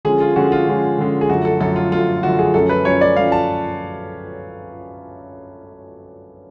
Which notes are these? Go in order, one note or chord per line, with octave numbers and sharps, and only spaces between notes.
D3 F3 G#3 C#4 G#4
F4
D3 F3 G#3 C#4 F#4
F4
D3 F3 G#3 C#4
D3 F3 G#3 C#4
G#4
F#2 D3 F3 A3 F#4
A4
F#2 D3 F3 A3 A4
F4
F#2 D3 F3 A3 F4
F#2 D3 F3 A3 F#4
G#4
F#2 F3 A3 C#4 A4
B4
F#2 F3 A3 C#4 C#5
D5
F#2 F3 A3 C#4 F5
A5